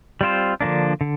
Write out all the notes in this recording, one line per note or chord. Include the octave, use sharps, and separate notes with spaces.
G3 C4 F4 C5
D3 F3 A#3 D4
D3